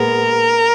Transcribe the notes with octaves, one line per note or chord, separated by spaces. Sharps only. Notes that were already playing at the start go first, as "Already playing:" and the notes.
Already playing: A#2 G#3 B3 A#4